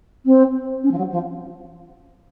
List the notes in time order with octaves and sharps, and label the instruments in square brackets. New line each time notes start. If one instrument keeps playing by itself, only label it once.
[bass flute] C4
C#4
F3
F#3
F3